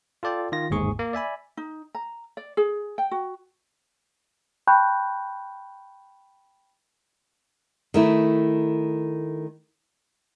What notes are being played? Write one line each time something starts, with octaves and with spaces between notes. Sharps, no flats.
F4 A4 D5 G5
D#3 F4 A#6
G1 D#2 G#2 G#4 C#6
A#3
D5 E5 G#5 B5
D#4
A#5
D5
G#4
G5
F#4
G5 A5 B5 C#6 F#6 G6
D#3 A3 E4